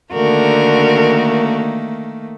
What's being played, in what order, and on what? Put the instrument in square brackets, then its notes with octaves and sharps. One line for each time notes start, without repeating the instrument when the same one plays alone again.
[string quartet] D3 F#4 A#4 [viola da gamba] D#3 A3 A#3